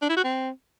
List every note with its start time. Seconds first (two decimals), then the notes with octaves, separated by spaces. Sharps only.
0.02 D4
0.09 E4
0.17 F#4
0.24 C4